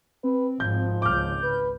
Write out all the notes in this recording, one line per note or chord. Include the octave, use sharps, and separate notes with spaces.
C4 B4
G#1 G#2 F3 G6
G#1 C#2 D6 F6 G6
B4